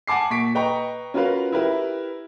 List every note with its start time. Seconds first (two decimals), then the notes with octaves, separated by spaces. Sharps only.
0.07 F#5 G#5 A5 D6 C7
0.30 A#2 C#6 B6 D7
0.55 B4 D#5 G5 A#5 C#6
1.14 C#4 F4 F#4 A#4 B4 F5
1.52 E4 G4 A#4 B4 E5